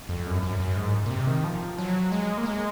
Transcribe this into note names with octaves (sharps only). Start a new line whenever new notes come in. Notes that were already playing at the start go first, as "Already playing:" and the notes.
F2
F#2
F#2
F#2
G#2
A#2
C3
D#3
F3
F#3
G#3
A#3
G#3